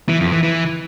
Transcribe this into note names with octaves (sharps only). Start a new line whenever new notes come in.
E3
F2
E3
E3